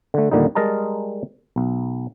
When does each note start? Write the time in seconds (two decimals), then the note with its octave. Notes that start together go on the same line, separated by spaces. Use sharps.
0.14 D3 A3
0.31 D#2 A#2 D3 G3 D#4
0.55 G3 G#3 A#4 D#5 A5 A#5
1.56 B1